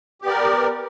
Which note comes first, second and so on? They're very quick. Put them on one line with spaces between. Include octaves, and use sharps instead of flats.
G4 B3 D5 A#4